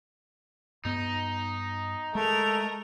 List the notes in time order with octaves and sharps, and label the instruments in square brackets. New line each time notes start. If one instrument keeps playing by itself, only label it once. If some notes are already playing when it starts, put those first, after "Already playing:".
[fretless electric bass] G2 B3 [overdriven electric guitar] D#4
[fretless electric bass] G#3 [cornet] A3 [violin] A#4 F7